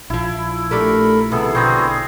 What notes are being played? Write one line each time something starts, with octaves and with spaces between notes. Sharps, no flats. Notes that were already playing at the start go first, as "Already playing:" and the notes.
A#1 F3 E4
A3 D4 G4 A4 A#4 B5
C3 D#3 B3 E4 G#4 A4
B2 D3 B3 F#4 G#4 C5 G5 A#5